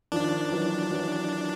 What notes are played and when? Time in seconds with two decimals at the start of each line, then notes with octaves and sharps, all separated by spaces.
0.12 D#3 F3 D4
0.51 E3 F#3
0.91 E3 F#3